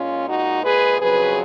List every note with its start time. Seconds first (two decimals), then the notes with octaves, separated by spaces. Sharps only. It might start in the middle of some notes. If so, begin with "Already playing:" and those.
Already playing: A#2 G#3 C#4 F4
0.29 D#4 F#4
0.64 G#4 B4
1.00 F2 C#3 F#3 G#4 B4